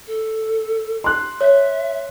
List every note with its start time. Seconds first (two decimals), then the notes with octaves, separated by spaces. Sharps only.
0.07 A4
1.04 C6 F#6
1.41 C#5 E5